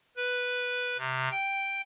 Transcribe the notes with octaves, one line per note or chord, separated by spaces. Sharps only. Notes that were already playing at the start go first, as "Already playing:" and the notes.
B4
C3
G5